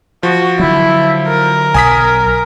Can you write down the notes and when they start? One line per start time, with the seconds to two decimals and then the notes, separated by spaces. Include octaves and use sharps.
0.23 F3 F#4
0.59 D3 F#3 E4
1.28 A#4
1.74 B1 G#5 D#6 B6